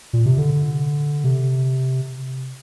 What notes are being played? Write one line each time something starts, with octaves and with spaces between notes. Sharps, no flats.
A#2
C3
D3
C3